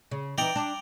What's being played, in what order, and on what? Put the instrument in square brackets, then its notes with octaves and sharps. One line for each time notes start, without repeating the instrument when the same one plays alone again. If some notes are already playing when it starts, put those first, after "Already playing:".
[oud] C#3
[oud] E3 D#4 [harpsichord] D5 G5 A#5
[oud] D4